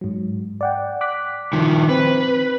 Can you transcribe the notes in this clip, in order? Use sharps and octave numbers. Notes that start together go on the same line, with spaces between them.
G#2 F#3
D5 F#5 G5
D6 F#6 B6
D#3 F3
C4 B4